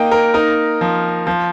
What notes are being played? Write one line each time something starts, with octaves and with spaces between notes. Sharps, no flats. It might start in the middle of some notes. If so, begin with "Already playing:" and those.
Already playing: A#3 D#4 D#5 G5
A#4
D#4 A#4
F3
F3